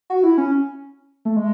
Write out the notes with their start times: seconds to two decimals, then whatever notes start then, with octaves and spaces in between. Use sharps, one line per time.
0.10 F#4
0.24 E4
0.38 C#4
1.25 A3
1.37 G#3